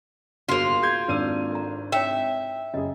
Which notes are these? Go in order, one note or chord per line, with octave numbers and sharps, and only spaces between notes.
G1 A#3 F4 F#4 G#4 C5
G#4 C6 G6 G#6
G#1 D4 B4 D6 E6 D#7
A4 A#5
E4 C#5 E5 G5
F#1 G#4 D#5